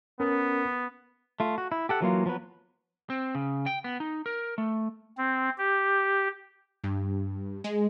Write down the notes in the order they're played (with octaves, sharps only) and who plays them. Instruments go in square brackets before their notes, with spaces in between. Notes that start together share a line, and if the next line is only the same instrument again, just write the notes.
[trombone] B3 [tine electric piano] C#4 A#4
[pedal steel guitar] A3 F4
F#4
E4
G4 A4 F#5
E3 F#3 A#3 F4
F3 F#3 B3 B4
[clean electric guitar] C4
C#3
G5
B3
D#4
A#4
A3
[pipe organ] C4
G4
[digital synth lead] G2
G#3